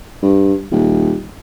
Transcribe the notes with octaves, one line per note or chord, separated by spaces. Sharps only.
G2
D#1